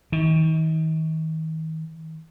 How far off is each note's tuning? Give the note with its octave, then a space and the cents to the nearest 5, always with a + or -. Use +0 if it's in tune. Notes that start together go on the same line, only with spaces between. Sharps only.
D#3 +40